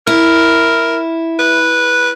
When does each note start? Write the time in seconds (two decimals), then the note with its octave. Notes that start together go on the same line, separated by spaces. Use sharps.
0.07 E4 A#4
1.39 B4